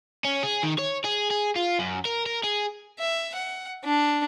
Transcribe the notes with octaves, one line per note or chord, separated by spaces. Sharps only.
C#4
G#4
D#3
C#5
G#4
G#4
F4
F#2
A#4
A#4
G#4
E5
F#5
D4